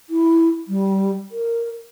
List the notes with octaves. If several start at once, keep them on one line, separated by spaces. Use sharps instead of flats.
E4
G3
A#4